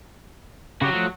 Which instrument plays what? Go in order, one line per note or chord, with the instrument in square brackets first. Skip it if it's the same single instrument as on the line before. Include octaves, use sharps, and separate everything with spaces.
[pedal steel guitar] C#3 G4 [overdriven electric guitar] F#3 F#4
[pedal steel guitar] F3 A3